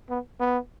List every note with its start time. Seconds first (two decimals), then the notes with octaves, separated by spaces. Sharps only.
0.10 B3
0.40 B3